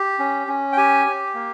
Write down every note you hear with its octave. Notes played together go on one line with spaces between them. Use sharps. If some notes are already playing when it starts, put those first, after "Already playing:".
Already playing: G4
C#4
C#4
G5
G4 G#5
G4
A#3